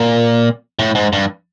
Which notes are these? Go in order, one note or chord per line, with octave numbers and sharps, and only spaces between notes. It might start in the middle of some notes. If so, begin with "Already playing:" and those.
Already playing: A#2
A2
G#2
G2